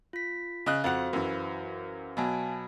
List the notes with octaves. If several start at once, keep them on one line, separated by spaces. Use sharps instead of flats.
F4 B6
C#3 D#5 F#6
F2 F#4 C5 F5 F#5
F#2 E3
B2 F#3 F5 G#5 A5